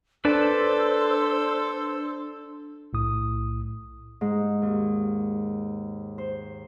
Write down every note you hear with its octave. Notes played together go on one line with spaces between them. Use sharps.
D4 A4 B4 C5 D5 A5 C6 E6
B1 A2 D#6
G#2
D#2
C5